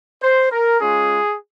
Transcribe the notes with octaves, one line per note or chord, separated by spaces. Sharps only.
C5
A#4
G#3 C#4 F4 G#4